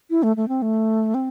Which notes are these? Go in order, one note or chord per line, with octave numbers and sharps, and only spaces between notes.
E4
A3
A3
C4
A3
C4